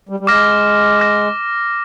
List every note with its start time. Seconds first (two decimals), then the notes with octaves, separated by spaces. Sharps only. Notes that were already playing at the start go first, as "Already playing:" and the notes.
0.09 G3
0.20 G3
0.27 G#3 D6 F6 A#6
0.99 D6 F6 A#6